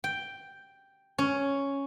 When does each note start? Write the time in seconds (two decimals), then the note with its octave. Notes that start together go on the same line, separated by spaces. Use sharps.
0.04 G5
1.18 C#4